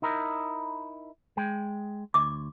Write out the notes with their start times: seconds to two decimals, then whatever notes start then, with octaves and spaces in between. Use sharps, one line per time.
0.02 D#4 E4 A#4
1.37 G#3 G5
2.14 D2 D6